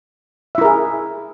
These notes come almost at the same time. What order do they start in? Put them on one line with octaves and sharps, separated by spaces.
E5 E4 A#4 G#4